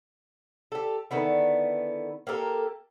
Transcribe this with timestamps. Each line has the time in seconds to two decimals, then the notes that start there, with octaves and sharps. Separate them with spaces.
0.72 G4 A4
1.11 D3 D#3 B3 E4
2.27 A#3 G4 A4 A#4